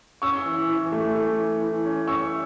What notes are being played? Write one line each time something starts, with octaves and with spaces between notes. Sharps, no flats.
C#4 C#6 E6
E3
E3
A3
A3
E3
E3
C#4
C#4 C#6 E6